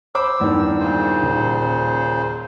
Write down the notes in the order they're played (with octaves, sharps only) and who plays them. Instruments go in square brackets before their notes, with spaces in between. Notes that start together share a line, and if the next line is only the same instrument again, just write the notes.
[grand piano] C5 B5 D6 [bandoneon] E6
[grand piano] E2 G2 D#3
[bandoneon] A#2 C#3 C5
[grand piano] D#1